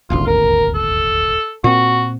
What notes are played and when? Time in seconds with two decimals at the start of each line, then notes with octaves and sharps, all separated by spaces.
0.10 D#1 G#1 D2 F4
0.27 A#4
0.75 A4
1.64 A#2 C4 F#4